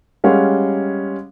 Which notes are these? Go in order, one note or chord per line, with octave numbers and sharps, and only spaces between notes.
G3 G#3 C#4 F5 F#5